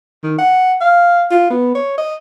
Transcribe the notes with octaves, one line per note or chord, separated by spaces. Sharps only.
D#3
F#5
F5
F4
B3
C#5
D#5